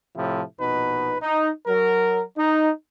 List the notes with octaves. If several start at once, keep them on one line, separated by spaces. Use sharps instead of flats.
A2 C3 F3 E4
A#1 B2 D#4 B4
D#4
F#3 A#4
D#4